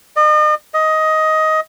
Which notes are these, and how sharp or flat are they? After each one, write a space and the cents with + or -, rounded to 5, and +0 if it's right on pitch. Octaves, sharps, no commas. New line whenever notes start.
D#5 -40
D#5 +15